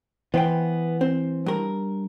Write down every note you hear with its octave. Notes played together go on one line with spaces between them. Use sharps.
E3 B3 C5 G5
C4 C5
G2 A#4